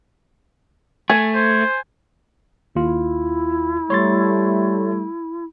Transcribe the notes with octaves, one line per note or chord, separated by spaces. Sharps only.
A3 G#5
C5
D#2 E4 F4
G3 A3 C#5 C6 A6